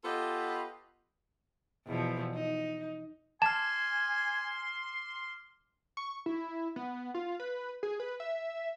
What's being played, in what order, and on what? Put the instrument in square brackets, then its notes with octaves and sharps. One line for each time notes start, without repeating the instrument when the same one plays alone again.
[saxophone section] B3 F4 G4 A4 B4 D#5
[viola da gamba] E2 B2 F3
D#4
[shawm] G#5 [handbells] A5 [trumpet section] C6 [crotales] D6 F6
[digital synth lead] C#6
E4
B3
F4
B4
G#4
B4
E5